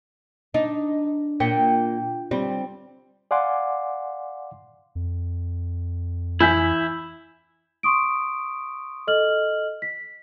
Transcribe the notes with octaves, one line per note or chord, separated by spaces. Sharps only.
D4 D#4
A#2 G5 B6 C#7
G3 C4
D5 F5 F#5 G#5 C6 D6
F2
E3 E4 G#5 G6 B6
C6 C#6 D#6 D7
A4 D#5 F6 F#7
B6